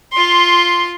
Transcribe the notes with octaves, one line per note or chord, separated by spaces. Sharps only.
F4 C6